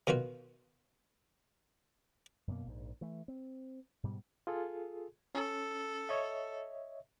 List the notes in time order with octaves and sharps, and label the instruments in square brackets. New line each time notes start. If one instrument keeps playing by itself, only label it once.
[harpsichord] B2 D#3 F4 F#4
[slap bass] F#2 B2 A#3
A#1 G#2
E3 A3
C4
G#2 B2 G3
[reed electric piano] F4 G#4 A4
[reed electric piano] C#4 [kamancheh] A4
[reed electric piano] C#5 D#5 E5